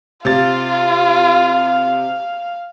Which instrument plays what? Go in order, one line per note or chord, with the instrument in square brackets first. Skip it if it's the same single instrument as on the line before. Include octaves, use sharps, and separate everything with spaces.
[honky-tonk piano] C3 A6 [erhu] F4 [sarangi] F5